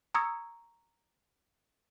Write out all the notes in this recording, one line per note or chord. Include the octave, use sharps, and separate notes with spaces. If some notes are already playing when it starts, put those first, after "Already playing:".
A#5 C#6 D#6 E6 G#6 C#7